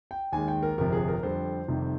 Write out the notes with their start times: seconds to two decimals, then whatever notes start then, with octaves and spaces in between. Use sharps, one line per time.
0.11 G5
0.32 D#2 D#3 G#3 G#5
0.48 G5
0.63 A#4
0.78 G1 F2 C3 F3 A#4
0.92 G#4
1.08 A#4
1.23 F2 D3 G3 C5
1.68 F1 F2 C3 D#3 G3